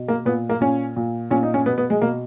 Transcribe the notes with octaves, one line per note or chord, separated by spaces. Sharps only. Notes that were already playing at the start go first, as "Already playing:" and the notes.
Already playing: B2
A#3
A#2 B3
A#3
A#2 C#4
A#2
A#2 C#4
D#4
C#4
B2 B3
B3
G#3
B2 A#3